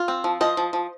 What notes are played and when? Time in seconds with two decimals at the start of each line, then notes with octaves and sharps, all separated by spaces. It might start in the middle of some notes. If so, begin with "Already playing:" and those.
Already playing: F4
0.08 C4
0.24 F3
0.41 F3 C5 D#5
0.57 F3
0.73 F3